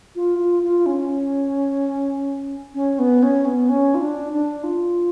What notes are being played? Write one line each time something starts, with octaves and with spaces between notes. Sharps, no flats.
F4
F4
F4
C#4
C#4
B3
C#4
B3
C#4
F4
D4
D4
F4